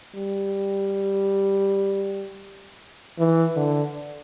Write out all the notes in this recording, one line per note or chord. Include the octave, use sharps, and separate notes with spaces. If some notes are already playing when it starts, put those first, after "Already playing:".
G3
E3
D3